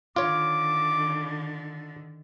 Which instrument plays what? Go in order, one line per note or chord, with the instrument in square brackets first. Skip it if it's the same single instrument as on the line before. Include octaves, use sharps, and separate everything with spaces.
[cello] D3 D#3 [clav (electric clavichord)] F4 C#5 [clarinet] D6